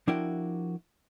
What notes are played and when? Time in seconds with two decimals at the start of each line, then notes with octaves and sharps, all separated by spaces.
0.08 F3 D4 E4 F#4 A#4 G5